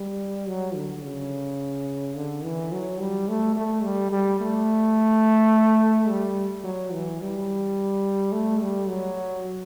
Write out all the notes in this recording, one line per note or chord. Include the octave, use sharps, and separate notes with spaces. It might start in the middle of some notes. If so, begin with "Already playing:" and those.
Already playing: G3
F#3
D3
C#3
D3
E3
F#3
G3
A3
A3
G3
G3
A3
G3
F#3
E3
G3
A3
G3
F#3